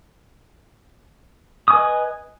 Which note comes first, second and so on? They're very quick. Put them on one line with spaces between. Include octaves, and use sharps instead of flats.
D#6 G#5 B4 D#5